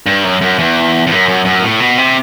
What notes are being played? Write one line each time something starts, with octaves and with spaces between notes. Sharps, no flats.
G2
F#2
F#2
E2
E2
F#2
F#2
F#2
A2
B2
C3